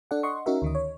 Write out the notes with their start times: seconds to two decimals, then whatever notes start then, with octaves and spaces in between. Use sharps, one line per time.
0.11 D4 A4 D5 F#5
0.23 D#5 F#5 C6 C#6
0.46 C#4 D#4 F#4 A#4 E5
0.62 D2 D#3 D#5
0.75 C#5